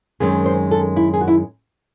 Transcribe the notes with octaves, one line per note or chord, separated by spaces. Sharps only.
F#2 D#3 G#3 C4 G#4
C5
A4
E4
G#4
F#4
E4